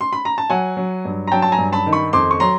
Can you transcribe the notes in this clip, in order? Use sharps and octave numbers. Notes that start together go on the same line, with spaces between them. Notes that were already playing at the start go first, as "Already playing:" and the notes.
C6
B5
A#5
A5
F#3 F#5 G#5
F#3
G2
A#5
F#3 G5 A5
A5
G#5 A#5
G2
A5 B5
D#3
B5 C#6
F2 C6 D6
C#6
F#3 A#5 C6